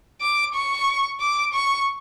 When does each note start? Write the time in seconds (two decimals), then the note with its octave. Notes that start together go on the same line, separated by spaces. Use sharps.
0.21 D6
0.54 C#6
1.20 D6
1.53 C#6